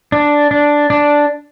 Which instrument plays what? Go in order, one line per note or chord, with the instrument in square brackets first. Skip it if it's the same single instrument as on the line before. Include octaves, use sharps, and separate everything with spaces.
[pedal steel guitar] D4
D4
D4